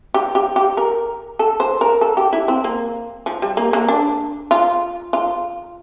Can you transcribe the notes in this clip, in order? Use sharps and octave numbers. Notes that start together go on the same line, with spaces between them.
G4
G4
G4
A#4
A4
C5
A#4
A4
G4
E4
C4
A#3
F3
G3
A#3
A#3
D4
F4
F4